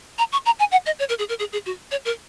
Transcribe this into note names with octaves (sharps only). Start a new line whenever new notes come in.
A#5
C#6
A#5
G#5
F#5
D#5
C#5
A#4
G#4
A#4
G#4
G#4
F#4
C#5
A#4